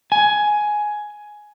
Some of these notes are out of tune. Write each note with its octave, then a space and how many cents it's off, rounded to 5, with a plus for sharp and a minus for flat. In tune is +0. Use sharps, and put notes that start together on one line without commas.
G#5 +10